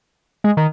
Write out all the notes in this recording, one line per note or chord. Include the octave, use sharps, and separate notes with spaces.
G#3
D#3